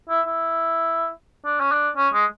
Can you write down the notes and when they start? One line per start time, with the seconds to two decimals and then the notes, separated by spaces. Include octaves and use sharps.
0.10 E4
0.26 E4
1.45 D4
1.60 C#4
1.72 D4
1.97 C#4
2.13 G#3